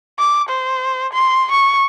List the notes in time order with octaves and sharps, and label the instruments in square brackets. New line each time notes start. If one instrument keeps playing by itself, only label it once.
[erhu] D6
C5
C6
C#6